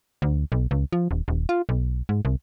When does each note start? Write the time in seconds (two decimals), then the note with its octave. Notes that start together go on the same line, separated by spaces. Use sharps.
0.22 D2
0.52 B1
0.71 C#2
0.93 F3
1.11 D#1
1.28 D#1
1.49 F4
1.69 B1
2.09 G#2
2.25 C2